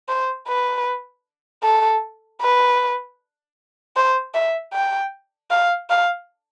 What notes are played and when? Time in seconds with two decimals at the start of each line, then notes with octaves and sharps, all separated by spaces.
0.08 C5
0.48 B4
1.63 A4
2.41 B4
3.96 C5
4.34 E5
4.73 G5
5.50 F5
5.90 F5